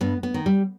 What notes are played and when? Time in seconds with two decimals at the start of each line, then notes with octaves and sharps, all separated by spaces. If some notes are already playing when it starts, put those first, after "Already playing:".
0.01 G2 B3
0.23 B3
0.34 D#3
0.46 G3